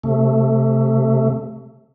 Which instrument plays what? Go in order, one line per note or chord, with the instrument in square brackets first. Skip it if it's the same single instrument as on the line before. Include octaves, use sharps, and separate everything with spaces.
[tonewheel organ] C3 A3